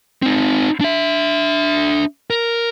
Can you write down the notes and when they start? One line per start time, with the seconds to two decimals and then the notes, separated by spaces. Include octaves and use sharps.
0.22 C4 D#4
0.81 D4 E5
2.30 A#4